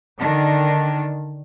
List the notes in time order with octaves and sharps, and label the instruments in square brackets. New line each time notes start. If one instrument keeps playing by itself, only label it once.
[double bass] D3 [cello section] D#3 D4